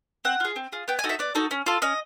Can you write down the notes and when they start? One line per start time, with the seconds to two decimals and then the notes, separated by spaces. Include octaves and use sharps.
0.25 C4 F#5
0.40 F4 G#4
0.56 C4
0.72 F4 G#4
0.88 B3 G5
0.99 G#5
1.04 D#4 F#4 A4
1.09 E5
1.19 B3 D5
1.35 D#4 F#4 A4
1.51 C#4
1.66 F4 A4
1.82 C#4 D#5